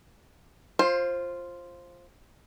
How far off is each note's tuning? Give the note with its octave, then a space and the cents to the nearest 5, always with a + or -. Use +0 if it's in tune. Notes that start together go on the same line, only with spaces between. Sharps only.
F4 -5 C5 +20